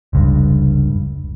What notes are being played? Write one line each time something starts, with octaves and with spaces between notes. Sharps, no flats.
F1 C#2 G2